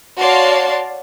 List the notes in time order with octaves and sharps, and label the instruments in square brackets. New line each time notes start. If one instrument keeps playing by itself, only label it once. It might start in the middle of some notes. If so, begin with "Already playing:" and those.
[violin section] F#4 C#5 D5 F5 A5 C6